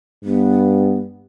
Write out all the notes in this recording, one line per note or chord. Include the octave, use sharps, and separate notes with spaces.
G2 B3